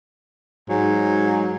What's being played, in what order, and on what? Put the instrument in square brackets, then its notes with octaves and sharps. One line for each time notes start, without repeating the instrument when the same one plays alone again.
[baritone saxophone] G#2 [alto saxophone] F#3